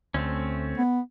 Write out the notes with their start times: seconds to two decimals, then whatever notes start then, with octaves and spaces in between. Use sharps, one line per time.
0.14 D2 A3 C4 C#4
0.78 B3